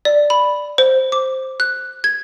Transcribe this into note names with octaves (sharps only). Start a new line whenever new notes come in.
D5
B5
C5
D6
F#6
G#6